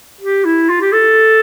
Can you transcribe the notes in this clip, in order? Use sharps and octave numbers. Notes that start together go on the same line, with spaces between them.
G4
E4
F4
G4
A4